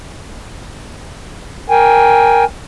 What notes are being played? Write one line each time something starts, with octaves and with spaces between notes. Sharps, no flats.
A#4 G5 G#5